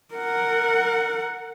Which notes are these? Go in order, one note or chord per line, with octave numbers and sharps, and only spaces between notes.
A#4 F#5